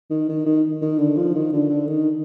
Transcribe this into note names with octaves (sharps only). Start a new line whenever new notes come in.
D#3
D#3
D#3
D#3
D3
F3
D#3
D3
D3
D#3